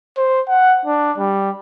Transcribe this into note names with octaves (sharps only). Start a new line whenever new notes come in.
C5
F#5
D4
G3